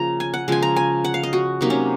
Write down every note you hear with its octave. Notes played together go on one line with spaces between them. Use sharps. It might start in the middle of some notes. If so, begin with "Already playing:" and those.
Already playing: C#3 F3 A#3 A#5
G#5
F#5
C#3 F3 G#3 G#5
A#5
G#5
F#5
F5
D#5
F#4
C3 F#3 A#3 D#4
C#4